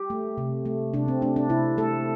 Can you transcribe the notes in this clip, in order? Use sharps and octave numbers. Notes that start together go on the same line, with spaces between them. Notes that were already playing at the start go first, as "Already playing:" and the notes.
Already playing: G4
A3
C3
A3
C3 D4
C4
A3 D4
D4
C3 E4
A3 A4